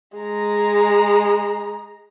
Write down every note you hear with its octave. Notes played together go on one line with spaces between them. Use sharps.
G#3 A#5